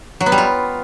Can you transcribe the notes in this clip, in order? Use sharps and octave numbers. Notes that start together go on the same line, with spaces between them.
F#3
B3
G3
F4